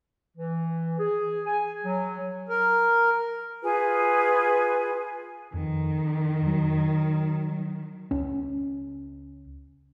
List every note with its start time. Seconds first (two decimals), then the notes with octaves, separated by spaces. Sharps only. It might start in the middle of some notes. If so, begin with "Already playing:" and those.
0.37 E3
0.99 G#4
1.46 G#5
1.85 F#3
2.49 A#4
3.62 F4 G#4 B4 G#5
5.54 F2 D#3
6.46 F#3
8.11 C#2 C#4